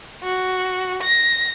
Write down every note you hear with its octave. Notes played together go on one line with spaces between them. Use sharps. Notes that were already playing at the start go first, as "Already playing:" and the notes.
F#4
A#6